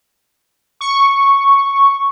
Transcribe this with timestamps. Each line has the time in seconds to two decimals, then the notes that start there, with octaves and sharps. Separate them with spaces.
0.81 C#6